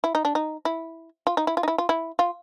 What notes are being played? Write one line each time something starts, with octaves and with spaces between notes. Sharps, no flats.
E4
D#4
D4
D#4
E4
F4
D#4
E4
F4
D#4
E4
F4
E4
F4